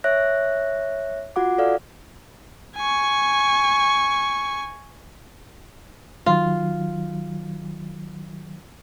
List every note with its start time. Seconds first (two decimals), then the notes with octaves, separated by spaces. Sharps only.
0.04 C#5 E5 F#6 A#6
1.36 F4 F#4 F#5 D6
1.58 A4 D5 F5
2.77 G#5 C#6
6.26 D#3 F#3 F4